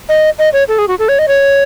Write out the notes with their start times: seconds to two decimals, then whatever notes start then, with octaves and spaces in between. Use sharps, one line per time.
0.09 D#5
0.39 D#5
0.53 C#5
0.68 A4
0.78 G#4
0.88 F#4
0.99 A4
1.09 C#5
1.19 D#5
1.28 C#5